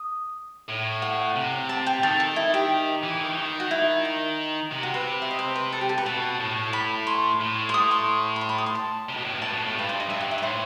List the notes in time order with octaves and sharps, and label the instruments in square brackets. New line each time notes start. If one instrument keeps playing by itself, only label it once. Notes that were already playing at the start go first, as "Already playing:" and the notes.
Already playing: [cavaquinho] D#6
[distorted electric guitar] A2
[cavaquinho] F#5
[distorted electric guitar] C3
[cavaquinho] A5
G5
[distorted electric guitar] D#3 [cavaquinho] A4
[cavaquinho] A4
E4
G4
[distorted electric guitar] E3
D#3
E3
D#3
[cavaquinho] F#4
E4
D#4
[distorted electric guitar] C3
[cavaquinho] F#4
B4
E5
D#5
C5
B4
A4
G4
A4
B4
[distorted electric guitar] B2 [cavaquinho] A5
[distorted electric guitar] A2
[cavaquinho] B5
C6
[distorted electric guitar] A2
[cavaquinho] C6
D#6
C6
B5
C6
B5
D#6
C6
A5
[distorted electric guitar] C3
B2
A2
G2
[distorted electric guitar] A2 [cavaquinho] A5
[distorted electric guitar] B2
A2
[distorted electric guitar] G2 [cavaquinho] B4
[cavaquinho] C5
D#5
[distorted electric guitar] G2 [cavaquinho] E5
[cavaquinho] F#5
E5
B4
[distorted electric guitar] A2 [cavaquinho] C5